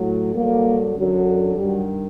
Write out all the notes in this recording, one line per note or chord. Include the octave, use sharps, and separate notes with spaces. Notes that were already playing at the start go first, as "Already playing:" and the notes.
Already playing: A2 F#3
G2 D3 F#3 A#3
F#2 D3 F#3
G2 D#3 F#3 G3